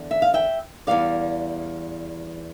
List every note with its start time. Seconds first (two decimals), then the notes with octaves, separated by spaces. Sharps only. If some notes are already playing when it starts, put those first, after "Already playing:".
Already playing: E2 D3
0.11 E5
0.22 F5
0.34 E5 G5
0.87 E2 C3 G3 D5 F5